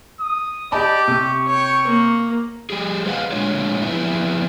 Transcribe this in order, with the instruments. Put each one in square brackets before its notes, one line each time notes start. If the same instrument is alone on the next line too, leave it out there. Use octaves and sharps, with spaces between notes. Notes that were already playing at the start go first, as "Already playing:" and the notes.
[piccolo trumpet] D#6
[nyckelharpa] G4 [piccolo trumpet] D5 [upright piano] D#5 A5 B5
[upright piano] C3 [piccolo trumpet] C#6
[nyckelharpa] C#5 G5
A#3
[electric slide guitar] G3 G4 G#4
G#4 B4 C5 D#5 F5 F#5
A#2 G#3 A3 D4 F4 C#5
F2 B3 E4